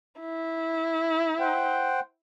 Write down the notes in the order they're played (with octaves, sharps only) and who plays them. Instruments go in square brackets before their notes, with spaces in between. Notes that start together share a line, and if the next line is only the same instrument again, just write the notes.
[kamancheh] E4
[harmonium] C5 F#5 G5